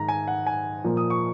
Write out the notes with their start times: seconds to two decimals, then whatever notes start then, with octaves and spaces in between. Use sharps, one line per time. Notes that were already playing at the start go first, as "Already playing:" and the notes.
Already playing: G#2 D#3 G#3 A#5
0.09 G#5
0.28 F#5
0.47 G#5
0.84 A#2 F3 A#3
0.97 D#6
1.10 C#6